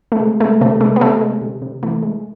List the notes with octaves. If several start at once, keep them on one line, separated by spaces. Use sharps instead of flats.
A3
C3 G#3
G#3 A3
C3 A3
G#3 A3
B3
C3 A3
G#3
C3
C3
E3 A3
G#3